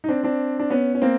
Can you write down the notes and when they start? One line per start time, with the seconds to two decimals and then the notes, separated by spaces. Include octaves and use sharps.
0.04 D#4
0.09 C4 D4
0.24 C4 D4
0.59 D4
0.70 B3 C#4
0.95 C#4
1.02 A#3 C4